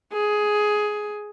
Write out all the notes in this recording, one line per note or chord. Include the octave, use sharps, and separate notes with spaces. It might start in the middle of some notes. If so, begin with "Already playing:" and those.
G#4